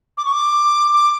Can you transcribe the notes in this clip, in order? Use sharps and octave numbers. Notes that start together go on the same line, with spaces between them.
D6
C#6
D6
D6